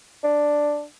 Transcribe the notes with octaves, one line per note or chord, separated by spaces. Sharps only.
D4